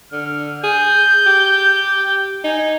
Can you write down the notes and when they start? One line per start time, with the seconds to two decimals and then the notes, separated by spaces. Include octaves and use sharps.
0.12 D3 F6
0.64 G#4 G6
1.27 G4
2.44 D#4 G#5